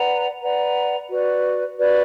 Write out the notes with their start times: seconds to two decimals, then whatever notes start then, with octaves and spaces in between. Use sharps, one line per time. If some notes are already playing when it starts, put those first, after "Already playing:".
Already playing: B4 D5 F#5 A#5
0.42 B4 D5 F#5 A#5
1.09 F#4 B4 D5
1.78 F#4 B4 D5